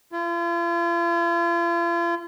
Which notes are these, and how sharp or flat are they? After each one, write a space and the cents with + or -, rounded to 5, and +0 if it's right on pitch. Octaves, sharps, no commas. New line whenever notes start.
F4 -40